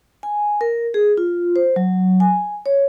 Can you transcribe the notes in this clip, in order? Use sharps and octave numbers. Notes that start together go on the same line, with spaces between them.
G#5
A#4
G#4
F4
C5
F#3
G#5
C#5